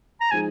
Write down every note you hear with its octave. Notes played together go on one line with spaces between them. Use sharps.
A#5
F3 G#3 D#4 G#4 G#5